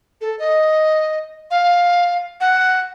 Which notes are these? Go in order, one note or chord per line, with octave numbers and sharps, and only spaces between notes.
A4
D#5
F5
F#5